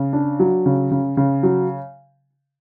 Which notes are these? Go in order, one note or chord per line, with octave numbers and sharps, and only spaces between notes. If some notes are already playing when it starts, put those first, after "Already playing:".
Already playing: C#3
D4
F#3
C#3
C#3
C#3
F#3